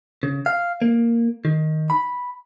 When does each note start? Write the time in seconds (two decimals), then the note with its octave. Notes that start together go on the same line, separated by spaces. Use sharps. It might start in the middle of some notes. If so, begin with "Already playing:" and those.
0.23 C#3
0.46 F5
0.82 A#3
1.45 D#3
1.90 B5